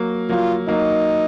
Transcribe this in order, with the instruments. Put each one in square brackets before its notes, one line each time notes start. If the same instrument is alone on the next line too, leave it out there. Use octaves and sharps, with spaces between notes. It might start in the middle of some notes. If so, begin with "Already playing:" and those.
Already playing: [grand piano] F#3 A#3
[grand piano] F#3 A#3 [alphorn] F4
[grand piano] F#3 A#3 [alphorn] D#4